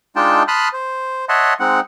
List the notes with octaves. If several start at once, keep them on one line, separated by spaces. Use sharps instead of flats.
G#3 D4 D#4 F4 G5 A5
A5 B5 C6 D#6 F6 F#6
C5
C#5 D#5 E5 F#5 A5 C6
G#3 C4 D#4 F#5